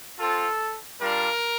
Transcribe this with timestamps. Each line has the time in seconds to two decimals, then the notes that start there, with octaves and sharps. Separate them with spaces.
0.19 C4 F4 A4
1.00 G3 D4 F4 A#4